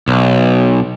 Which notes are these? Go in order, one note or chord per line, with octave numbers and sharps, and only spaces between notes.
B1